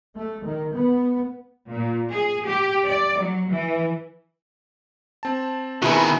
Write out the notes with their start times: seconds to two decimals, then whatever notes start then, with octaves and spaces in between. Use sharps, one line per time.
0.15 A3
0.45 D#3
0.76 B3
1.72 A#2
2.11 G#4
2.45 G4
2.88 D5
3.20 F#3
3.51 E3
5.23 C4 A5
5.82 B2 D#3 E4 F#4 G#4 B4 G#5